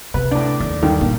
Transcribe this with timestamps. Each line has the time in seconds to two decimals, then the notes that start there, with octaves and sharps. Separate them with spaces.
0.14 C3 B4
0.31 A2 D4
0.60 D#2
0.83 G2 D3 D#3
1.01 A#2